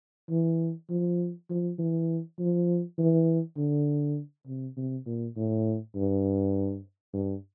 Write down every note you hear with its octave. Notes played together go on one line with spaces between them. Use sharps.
E3
F3
F3
E3
F3
E3
D3
C3
C3
A#2
A2
G2
G2